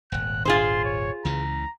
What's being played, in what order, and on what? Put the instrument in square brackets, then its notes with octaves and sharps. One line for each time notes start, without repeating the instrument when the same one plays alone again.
[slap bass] D#1 G#1 [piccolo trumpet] F#6
[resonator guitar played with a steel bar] F4 G#4 C5 [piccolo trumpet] C6
[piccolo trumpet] C#5
[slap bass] C#2 C#3 E3 [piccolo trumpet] A#5